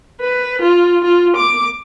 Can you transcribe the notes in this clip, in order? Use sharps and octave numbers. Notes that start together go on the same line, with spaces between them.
B4
F4
F4
D6